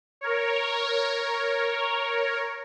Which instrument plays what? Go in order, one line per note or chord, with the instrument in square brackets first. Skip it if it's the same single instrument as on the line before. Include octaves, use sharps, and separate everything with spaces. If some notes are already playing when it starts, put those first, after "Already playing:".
[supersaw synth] A#4 C#5